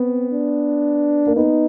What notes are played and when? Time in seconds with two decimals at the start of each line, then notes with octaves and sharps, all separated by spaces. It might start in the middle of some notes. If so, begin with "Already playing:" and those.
Already playing: B3 C4
0.32 D4
1.27 A#3
1.36 B3 D#4